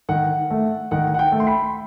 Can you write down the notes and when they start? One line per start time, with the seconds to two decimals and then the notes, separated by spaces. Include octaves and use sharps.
0.09 D#3 F#5
0.51 A3
0.91 D#3 F#5
1.14 F#5
1.19 G5
1.32 A3
1.40 C6
1.47 B5